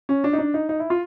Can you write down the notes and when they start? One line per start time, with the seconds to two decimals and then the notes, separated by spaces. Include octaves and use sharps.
0.09 C#4
0.24 D4
0.33 D#4
0.39 D4
0.54 D#4
0.69 D#4
0.79 E4
0.90 F4